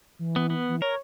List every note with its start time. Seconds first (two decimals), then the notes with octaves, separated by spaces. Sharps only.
0.19 E3
0.36 B3
0.50 B3
0.69 E3
0.82 A#4 C#5